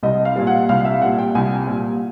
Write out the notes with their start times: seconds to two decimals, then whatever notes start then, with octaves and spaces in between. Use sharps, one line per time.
0.03 C2 D#5
0.25 F5
0.36 A#2 G3
0.47 F#5
0.69 C2 F5
0.85 E5
1.02 A#2 G3 F#5
1.18 G5
1.35 C2 G#5
1.67 A#2 G3